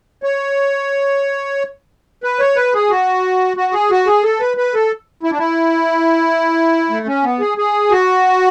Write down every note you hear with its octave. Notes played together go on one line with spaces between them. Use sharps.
C#5
B4
C#5
B4
G#4
F#4
F#4
G#4
F#4
G#4
A4
B4
B4
A4
E4
D4
E4
A3
C#4
B3
G#4
G#4
F#4